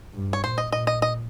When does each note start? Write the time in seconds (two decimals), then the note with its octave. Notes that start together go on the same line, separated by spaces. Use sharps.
0.14 G2
0.33 C#5
0.43 A#2 C5
0.58 D#5
0.72 A#2 D#5
0.87 D#5
1.02 D#5